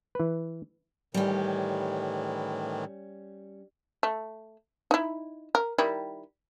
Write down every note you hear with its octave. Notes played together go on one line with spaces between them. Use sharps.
E3 B4
A2 D#3 E3 G3 C#4
A3
D#4 E4
A#4
D#3 G3 E4